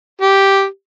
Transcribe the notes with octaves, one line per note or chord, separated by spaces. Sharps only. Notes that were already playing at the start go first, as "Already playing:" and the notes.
G4